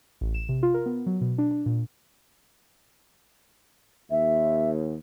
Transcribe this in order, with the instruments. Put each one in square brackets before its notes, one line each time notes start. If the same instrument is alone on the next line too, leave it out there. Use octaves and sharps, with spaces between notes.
[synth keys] A1
E7
C3
F4
A#4
B3
F#3
B2
D4
D4
A#2
[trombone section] D#2 [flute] E5